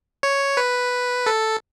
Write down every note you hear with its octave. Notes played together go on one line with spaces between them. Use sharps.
C#5
B4
A4